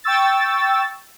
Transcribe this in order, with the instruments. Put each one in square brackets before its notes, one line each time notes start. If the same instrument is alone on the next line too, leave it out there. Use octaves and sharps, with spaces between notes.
[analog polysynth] G5 C#6 E6 A6